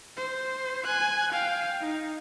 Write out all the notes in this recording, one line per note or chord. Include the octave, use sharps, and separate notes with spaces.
C5
G#5 F#6
F5 G5
D#4